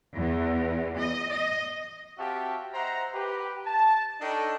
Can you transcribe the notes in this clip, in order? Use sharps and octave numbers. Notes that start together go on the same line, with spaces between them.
E2
D#5
D#5
C4 F#4 G4 E5 F5 A5
C5 D#5 E5 F#5 A#5
G4 B4
A5
D4 D#4 A4 C#5 D#5 G5